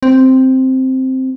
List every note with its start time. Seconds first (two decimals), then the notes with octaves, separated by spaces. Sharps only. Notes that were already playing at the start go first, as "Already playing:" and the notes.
0.03 C4